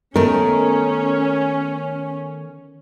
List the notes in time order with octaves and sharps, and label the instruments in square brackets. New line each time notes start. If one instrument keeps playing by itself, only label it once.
[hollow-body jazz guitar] D#3 A3 [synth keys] B3 [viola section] C#4 [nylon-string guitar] A#4